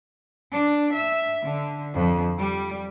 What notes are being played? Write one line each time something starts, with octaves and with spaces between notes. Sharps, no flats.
D4
E5
D3
F2
G3